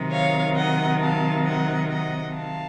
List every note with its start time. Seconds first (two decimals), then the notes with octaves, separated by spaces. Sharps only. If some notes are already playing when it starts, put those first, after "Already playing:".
Already playing: C3 D#3 F#3 C4
0.11 C#5 F5
0.56 D#5 F#5
1.01 F5 A5
1.45 D#5 F#5
1.90 D#5 F#5
2.35 F5 A5